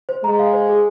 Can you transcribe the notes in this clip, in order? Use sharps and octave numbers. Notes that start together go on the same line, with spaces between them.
C5
G#3 A#5
F5
C5
G#4